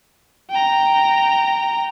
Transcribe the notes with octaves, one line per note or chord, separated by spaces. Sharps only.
G5 A#5